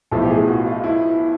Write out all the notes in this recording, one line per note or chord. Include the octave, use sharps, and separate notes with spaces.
B1 A2 F3 A4
G4
G#4
F#4
F4
E4